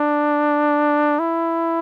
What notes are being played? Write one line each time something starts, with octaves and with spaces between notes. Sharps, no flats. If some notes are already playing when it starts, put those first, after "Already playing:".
Already playing: D4
E4